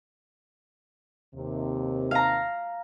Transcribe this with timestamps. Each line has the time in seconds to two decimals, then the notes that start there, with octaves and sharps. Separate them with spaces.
1.34 D#2 C3
2.11 F5 A#5